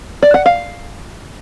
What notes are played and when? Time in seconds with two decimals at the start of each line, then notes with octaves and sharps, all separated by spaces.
0.23 D5
0.34 F#5
0.46 F5